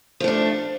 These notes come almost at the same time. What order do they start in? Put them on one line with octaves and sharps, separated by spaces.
F3 A3 D4